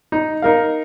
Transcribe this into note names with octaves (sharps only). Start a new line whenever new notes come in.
D#4
D#4 A#4 F5